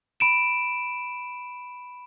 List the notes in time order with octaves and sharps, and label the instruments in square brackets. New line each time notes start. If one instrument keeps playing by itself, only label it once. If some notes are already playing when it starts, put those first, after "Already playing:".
[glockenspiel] B5 D7 E7